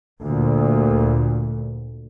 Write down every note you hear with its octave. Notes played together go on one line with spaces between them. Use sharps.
D2 A#2